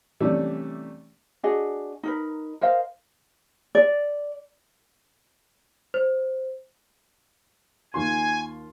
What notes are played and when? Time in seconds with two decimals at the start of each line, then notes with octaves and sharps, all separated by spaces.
0.20 C3 E3 G3 A3 C#4 D4
1.43 D4 F#4 G#4 D#5
2.03 D#4 A#4 B4
2.61 A#4 C5 D#5 F5
3.75 D5
5.94 C5
7.94 D#2 F4 G#5 C6